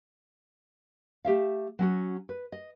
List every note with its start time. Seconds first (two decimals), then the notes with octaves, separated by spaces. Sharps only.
1.25 A3 G4 E5 F5
1.79 F#3 C#4 F#4
2.29 B4
2.52 D#5